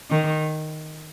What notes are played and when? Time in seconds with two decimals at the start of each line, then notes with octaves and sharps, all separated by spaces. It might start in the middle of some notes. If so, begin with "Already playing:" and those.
0.10 D#3